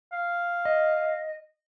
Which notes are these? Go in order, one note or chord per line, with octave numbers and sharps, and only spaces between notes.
F5
D#5